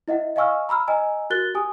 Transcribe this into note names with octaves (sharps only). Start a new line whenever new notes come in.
E4 D#5 E5 F#5
D#5 F5 G#5 C#6 E6 F6
A#5 B5 E6 F6
D#5 G#5 A#5 E6
F#4 A#4 F#6 A6 G7
G4 G#5 D#6